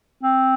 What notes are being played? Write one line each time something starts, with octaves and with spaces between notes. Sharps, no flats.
C4